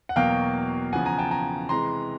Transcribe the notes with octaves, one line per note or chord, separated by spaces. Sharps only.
F#5
E2 B2 F#3 A#3 F5 G5
E2 C#3 F3 F#5 G#5
G#5 A#5
G5 A5
G#5 A#5
C3 E3 G#3 A#5 C6